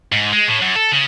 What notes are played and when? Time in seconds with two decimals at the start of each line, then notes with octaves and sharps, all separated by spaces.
0.12 G#2
0.32 G#3
0.47 A2
0.61 F#2
0.76 A4
0.92 C#3